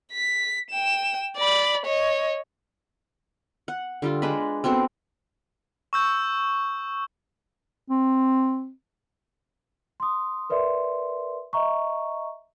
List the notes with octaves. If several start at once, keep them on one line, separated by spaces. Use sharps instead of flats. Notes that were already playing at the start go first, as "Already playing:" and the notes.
B6
G5 E7
D5 B5
C#5 D#5
F#5
D3 G3 F4
G#3 D4 B4 B5
B3 C4 F#4 A4
C#6 E6 G6
C4
C6 D#6
A#4 B4 D5 E5 C6
D#5 E5 A#5 C#6